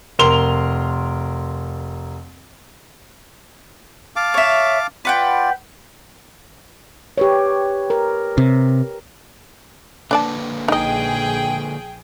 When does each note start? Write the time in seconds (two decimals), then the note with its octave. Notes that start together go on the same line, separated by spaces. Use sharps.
0.19 F1 A#4 C6 F7 G7
4.16 F5 A5 D6
4.34 C#5 E5
5.05 F4 B4 D5 F#5 G5
7.18 G4 B4 C#5
7.90 A#4
8.38 C3
10.11 D3 A#3 D4 B4 D5 A5
10.68 A#1 D#4 G#4 D#5 G5